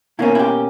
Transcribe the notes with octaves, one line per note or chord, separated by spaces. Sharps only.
B2 A#3 C#4 E4
E4
G4